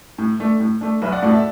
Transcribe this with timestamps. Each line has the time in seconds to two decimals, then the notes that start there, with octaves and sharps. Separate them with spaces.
0.18 A2
0.40 A3 D4
0.60 A2
0.81 A3 D4
1.02 B1 B4 E5
1.12 D5 F#5
1.22 A2 A3 F#4 D5 F#5
1.33 E5 A5